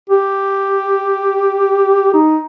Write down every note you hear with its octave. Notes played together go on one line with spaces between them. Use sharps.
G4
D#4